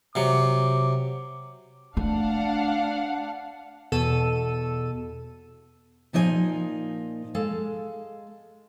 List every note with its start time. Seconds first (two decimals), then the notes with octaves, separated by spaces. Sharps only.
0.15 C3 F#3 D6
1.97 A3 D4 F5 F#5
3.92 E2 B2 A4 E6 D#7
6.13 A#2 F3 D#4 D5 G#5
7.35 G#3 A4 F5